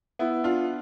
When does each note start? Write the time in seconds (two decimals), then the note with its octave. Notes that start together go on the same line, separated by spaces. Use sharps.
0.19 B3 E4
0.44 D4 F4